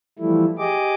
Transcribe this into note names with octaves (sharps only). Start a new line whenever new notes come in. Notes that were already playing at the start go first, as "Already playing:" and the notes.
E3 F3 G3 A3 E4
G4 G#4 D#5 D6